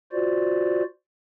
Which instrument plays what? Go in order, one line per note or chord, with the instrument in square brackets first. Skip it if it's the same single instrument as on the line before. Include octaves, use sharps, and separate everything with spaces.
[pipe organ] F4 F#4 C5 D5